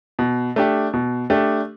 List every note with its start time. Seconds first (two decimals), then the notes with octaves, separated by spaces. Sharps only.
0.19 B2
0.56 A3 D4 G4
0.93 B2
1.30 A3 D4 G4